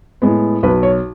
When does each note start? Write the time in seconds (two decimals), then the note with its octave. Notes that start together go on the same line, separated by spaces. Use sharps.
0.22 A2 G#3 B3
0.63 B1 B4
0.83 C#5